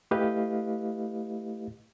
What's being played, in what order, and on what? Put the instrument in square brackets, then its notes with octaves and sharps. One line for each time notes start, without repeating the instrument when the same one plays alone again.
[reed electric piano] A3 E4 G4 B4 D#5 F5